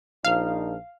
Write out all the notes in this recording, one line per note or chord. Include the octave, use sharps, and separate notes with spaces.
A#1 F3 D#4 F5